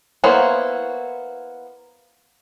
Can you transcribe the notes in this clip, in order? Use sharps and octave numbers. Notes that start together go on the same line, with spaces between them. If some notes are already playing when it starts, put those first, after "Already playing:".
A#3 B3 E4 C5 C#5